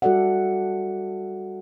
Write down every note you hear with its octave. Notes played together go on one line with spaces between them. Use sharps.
G3 F#4 A4 D5 E5 F#5